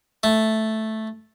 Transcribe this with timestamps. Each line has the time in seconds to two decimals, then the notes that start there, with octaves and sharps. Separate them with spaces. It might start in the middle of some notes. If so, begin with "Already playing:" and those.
0.23 A3